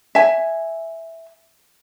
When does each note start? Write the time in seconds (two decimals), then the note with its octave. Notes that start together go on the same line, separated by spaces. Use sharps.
0.15 E5 G#5